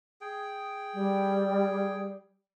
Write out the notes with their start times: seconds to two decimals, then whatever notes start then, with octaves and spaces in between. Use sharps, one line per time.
0.21 G#4 G5
0.94 G3